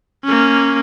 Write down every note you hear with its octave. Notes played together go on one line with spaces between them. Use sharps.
A#3 C#4